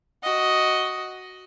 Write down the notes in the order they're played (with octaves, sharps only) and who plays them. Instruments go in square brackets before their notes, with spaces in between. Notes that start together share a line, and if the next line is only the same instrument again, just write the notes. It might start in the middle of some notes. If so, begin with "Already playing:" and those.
[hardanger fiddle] F#4 D#5